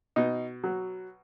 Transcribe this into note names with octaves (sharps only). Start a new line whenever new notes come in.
B2 D#4
F#3